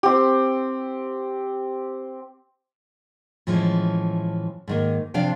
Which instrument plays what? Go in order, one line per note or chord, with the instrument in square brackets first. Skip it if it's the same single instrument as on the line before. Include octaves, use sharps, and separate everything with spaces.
[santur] C4 G4
[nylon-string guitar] A2 E3 F3 G#3 C#4
G#2 D#3 A#3
C3 F3 D4 F5 G5